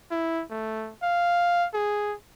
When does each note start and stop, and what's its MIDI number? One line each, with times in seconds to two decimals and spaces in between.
0.11 0.43 64
0.50 0.92 57
1.03 1.66 77
1.74 2.14 68